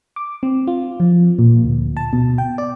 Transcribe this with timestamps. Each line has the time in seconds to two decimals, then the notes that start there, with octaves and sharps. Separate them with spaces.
0.16 D6
0.43 C4
0.67 F4
1.00 F3
1.39 A#2
1.64 D2
1.97 A5
2.13 B2
2.38 G5
2.58 D5